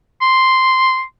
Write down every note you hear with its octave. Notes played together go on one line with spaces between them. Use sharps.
C6